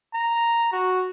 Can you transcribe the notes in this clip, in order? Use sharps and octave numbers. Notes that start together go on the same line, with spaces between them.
A#5
F#4